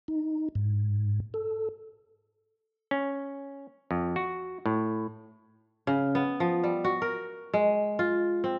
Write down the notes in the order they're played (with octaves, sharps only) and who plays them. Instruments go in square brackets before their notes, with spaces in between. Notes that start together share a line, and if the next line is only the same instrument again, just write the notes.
[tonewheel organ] D#4
G#2
A4
[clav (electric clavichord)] C#4
F2
F#4
A2
[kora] C#3
B3
F3
G3
F#4
A#4
G#3
F4
C4